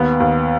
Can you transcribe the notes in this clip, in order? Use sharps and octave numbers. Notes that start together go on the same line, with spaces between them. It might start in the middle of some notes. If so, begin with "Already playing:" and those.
Already playing: D#2 B3
D#2